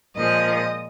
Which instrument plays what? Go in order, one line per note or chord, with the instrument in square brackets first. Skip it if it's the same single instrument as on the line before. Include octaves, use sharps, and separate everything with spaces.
[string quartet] A#2 F3 G#3 D#5